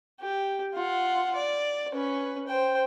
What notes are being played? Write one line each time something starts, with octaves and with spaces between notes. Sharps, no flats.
G4
F4 F#5
D5
C#4 B4
C5 G5